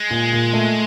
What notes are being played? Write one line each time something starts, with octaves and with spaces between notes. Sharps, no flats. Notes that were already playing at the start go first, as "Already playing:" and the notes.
Already playing: G#3
A#2
A#2
A3